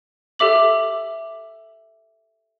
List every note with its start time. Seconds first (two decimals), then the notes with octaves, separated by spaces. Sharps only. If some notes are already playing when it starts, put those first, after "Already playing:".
0.39 G4 A4 E5 D6 F#7